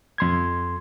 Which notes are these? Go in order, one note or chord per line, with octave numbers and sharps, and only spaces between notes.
F2 C6 G#6